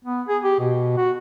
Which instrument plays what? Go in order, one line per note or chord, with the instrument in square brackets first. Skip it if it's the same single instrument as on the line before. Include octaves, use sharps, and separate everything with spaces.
[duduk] B3
G#4
G4
B2
F#4